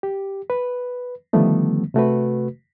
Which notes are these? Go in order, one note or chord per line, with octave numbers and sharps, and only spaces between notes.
G4
B4
D3 D#3 F3 G3 A3 B3
C3 A3 F#4 B4